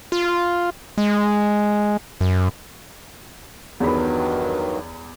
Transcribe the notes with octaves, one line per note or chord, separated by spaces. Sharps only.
F4
G#3
F#2
E2 G2 D#3 F#3 B5